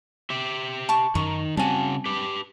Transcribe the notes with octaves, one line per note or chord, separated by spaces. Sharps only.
G4 E5
A5 C#6 D6
F#2 D#3 A#5 C#6
C#3 G3 C4 F#4 G#5 A5
G4 B4